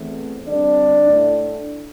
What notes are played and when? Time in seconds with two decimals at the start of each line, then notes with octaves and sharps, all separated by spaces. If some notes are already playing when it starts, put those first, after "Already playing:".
Already playing: E2 E3 A3 C4
0.48 D3 G3 C4 D4 D5
1.07 A2 A3 D4